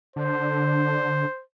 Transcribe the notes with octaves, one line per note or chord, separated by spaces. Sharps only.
D3 C5